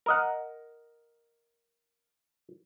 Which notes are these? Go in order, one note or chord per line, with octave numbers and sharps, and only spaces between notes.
A#4 D#5 F#5